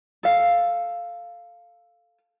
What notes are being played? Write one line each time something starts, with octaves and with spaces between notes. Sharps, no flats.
A4 F5